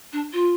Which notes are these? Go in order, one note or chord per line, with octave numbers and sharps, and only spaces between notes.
D4
F4